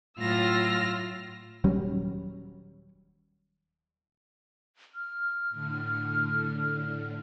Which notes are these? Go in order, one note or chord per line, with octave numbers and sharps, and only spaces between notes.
A2 F#3 F4 E6 F6 A#6
D#1 F#3 G3 C#4
F6
A2 D3